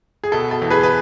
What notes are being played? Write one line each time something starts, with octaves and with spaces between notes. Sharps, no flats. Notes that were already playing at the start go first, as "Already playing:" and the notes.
G#4
B2 A4
A4
E2
G#4 B4
B4